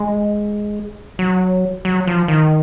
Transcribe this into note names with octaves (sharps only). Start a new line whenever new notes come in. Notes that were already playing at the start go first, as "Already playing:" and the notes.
Already playing: G#3
F#3
F#3
F3
D#3